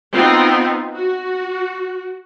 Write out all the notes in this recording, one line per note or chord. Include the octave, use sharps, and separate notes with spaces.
B3 C4 D#4 F4
F#4